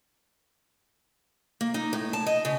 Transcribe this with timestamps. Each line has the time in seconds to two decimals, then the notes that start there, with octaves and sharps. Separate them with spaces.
1.61 A#3
1.74 D#4
1.93 A2
2.13 A5
2.26 D#5
2.45 C#3